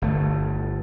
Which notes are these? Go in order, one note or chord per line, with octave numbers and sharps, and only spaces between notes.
G1 A3